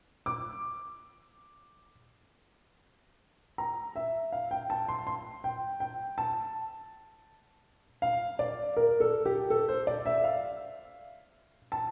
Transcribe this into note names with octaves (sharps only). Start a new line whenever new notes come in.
D6
A#5
E5
F5
G5
A5
C6
C6
G5
G5
A5
F5
D5
A#4
A4
G4
A4
C5
D5
E5
F5
A5